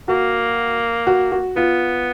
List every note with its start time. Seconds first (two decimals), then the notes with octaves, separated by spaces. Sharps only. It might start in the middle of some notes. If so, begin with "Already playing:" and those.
0.08 A#3 F#4
1.07 F#4
1.32 F#4
1.56 B3 F4